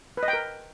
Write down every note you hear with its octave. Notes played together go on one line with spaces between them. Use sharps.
B4
D#5
G5
A#4